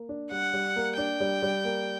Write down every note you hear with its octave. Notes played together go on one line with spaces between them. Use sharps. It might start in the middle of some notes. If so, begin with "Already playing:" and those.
Already playing: A#3
D4
G3 F#5
G3
A#3
D4 G5
G3
G3
A#3